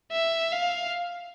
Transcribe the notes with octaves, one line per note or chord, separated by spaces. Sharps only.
E5
F5